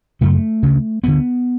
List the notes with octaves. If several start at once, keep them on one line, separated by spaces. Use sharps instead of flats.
F#2 C#3 A3
D2 C#3
D2 D3 B3